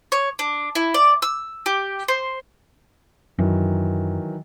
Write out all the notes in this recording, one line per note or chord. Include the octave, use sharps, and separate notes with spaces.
C#5
D4
E4
D5
E6
G4
C5
F#2 D#3 E3 F#3